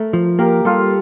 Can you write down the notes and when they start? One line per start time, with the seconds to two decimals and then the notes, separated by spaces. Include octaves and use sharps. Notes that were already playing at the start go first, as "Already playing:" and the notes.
Already playing: A3 A#4
0.13 F3
0.39 A#3 G4 A#4
0.65 G3 F4 A4